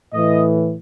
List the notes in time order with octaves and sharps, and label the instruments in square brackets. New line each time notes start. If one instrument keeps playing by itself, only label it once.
[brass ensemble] A2 E3 D#5